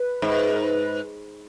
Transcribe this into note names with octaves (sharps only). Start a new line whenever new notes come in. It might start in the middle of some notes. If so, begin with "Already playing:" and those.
Already playing: B4
G#2
A#4
B4